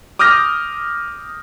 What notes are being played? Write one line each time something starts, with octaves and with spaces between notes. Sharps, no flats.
D6 D#6 F6 G6 A#6